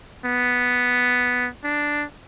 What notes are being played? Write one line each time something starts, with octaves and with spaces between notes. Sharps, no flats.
B3
D4